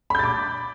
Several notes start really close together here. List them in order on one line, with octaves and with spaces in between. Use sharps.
B5 G6 A6 D6